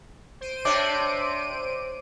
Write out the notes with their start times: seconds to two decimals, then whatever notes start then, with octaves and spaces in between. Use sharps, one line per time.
0.41 C5 D7 D#7
0.65 C3 D4 C#5 D6